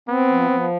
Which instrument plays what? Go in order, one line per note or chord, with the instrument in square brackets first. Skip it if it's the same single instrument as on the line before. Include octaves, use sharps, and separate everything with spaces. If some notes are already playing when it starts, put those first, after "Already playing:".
[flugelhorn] B3 [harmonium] C4
[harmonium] F3
F3